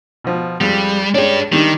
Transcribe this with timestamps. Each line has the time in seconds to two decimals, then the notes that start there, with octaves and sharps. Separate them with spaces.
0.24 B2 F3
0.61 F2 G3 G#3
1.15 G#3 C#4 D4 G4
1.52 D#3 G3 D4 D#4